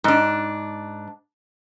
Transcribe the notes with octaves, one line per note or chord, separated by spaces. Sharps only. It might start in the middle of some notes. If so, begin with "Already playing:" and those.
G#2 D4